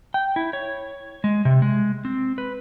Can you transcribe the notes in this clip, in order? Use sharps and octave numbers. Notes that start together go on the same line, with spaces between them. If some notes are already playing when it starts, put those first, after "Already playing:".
G5
E4
C#5
G#3
C3
G#3
C4
B4